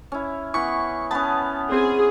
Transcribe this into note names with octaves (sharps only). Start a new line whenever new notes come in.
C#4 E4
E3 B3 C#6
B3 C#4 A5
C4 G#4